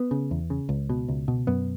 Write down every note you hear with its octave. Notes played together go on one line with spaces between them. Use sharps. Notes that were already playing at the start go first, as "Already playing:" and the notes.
Already playing: B3
C#3
E2
C#3
C#2
B2
C#2
B2
F#2 B3